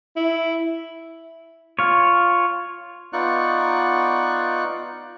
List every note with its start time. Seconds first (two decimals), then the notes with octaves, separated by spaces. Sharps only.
0.16 E4
1.79 F4 C#5
3.13 B3 D#4 F4 D5 C#6 F#6